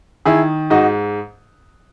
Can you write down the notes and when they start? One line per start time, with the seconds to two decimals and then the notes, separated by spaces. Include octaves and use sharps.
0.25 D#3 E4 G#4
0.70 G#2 D#4 F#4